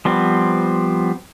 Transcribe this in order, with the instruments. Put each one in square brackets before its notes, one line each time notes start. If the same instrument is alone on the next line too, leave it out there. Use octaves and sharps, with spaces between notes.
[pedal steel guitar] F3 G3 B3 C4